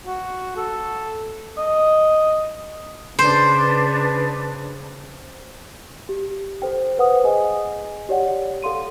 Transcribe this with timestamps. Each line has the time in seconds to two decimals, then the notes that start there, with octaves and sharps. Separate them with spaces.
0.06 F#4
0.57 A4
1.58 D#5
3.19 C#3 D4 B4 C5
6.09 G4
6.62 A4 C5 G5
6.98 B4 C5 F#5 G5 D#6
7.24 G#4 D#5 G#5
8.09 G4 C#5 D5 F#5 G5
8.63 A4 F5 C6 D#7